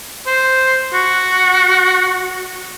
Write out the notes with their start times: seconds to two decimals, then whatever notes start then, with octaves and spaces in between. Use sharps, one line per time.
0.27 C5
0.94 F#4